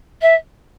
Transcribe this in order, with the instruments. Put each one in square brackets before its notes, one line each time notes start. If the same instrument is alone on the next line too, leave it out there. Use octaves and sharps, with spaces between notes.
[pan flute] E5